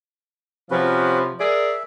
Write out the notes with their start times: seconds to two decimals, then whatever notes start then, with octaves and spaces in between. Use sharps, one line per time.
0.71 C3 F3 C#4 F#4 B4
1.39 G#4 A#4 D5 E5